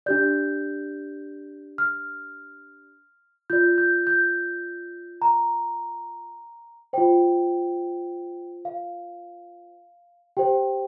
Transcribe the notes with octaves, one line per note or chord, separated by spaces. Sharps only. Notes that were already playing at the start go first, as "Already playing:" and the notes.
D4 G4 D5 G6
F6
F4 D5 G6
G6
G6
A#5
F4 C5 G5
F5
G4 C5 G5